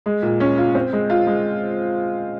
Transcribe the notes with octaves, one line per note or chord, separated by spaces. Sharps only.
G#3
A#2
C#4
F4
C4
G#3
F4
G#3